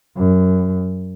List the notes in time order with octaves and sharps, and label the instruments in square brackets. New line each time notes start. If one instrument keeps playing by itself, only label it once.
[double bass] F#2